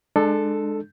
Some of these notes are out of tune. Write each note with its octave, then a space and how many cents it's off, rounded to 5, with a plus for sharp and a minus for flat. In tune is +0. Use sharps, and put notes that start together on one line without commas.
G#3 +0 D4 +30 A4 +0